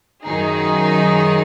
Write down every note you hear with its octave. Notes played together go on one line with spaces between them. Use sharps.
F#2 D#3 F#3 D#4 G#4